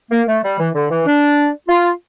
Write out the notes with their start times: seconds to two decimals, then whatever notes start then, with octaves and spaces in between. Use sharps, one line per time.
0.12 A#3
0.28 A3
0.44 G3
0.59 E3
0.75 D3
0.91 E3
1.06 D4
1.68 F4